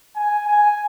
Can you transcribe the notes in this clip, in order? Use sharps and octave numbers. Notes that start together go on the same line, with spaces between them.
G#5
G#5